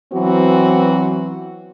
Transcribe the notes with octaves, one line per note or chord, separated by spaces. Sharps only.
E3 F#3 B3 C4 F#4